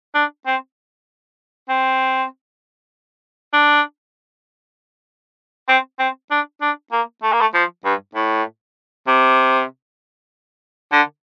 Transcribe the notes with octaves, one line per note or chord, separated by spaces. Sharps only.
D4
C4
C4
D4
C4
C4
D4
D4
A#3
A3
A#3
A3
F3
G2
A2
C3
D3